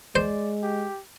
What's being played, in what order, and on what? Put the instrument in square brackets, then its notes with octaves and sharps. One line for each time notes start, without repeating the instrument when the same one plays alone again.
[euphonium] G#3 [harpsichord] C5 [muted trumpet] D5
[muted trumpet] G4